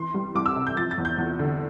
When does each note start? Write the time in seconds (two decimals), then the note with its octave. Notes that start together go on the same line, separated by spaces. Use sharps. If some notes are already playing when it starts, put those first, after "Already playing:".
Already playing: E3 C6
0.14 G3
0.35 C2 D6
0.46 E6
0.56 C3
0.67 G6
0.77 F3 A6
0.91 A6
0.98 E2
1.05 G6
1.18 E2
1.39 D3